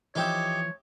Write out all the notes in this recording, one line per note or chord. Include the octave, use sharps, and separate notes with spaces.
E3 F3 D#4 G4 C#5 E5